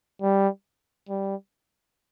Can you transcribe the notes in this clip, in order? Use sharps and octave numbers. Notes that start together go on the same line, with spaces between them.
G3
G3